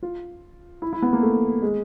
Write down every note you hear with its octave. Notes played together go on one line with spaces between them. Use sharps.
F4
E4
E4
B3
A#3
A3
G#3